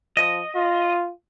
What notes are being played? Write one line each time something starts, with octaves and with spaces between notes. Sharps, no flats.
F3 D#5
F4